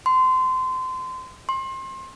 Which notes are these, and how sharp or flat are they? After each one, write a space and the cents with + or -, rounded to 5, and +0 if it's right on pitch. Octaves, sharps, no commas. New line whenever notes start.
C6 -25
C6 +30